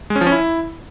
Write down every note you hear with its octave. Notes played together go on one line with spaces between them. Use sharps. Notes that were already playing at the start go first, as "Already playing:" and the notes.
G#3
C#4
F3
C#4
E4